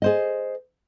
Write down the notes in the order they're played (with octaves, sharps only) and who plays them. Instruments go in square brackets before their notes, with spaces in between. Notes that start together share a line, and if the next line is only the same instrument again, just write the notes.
[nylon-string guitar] G#4 C5 D#5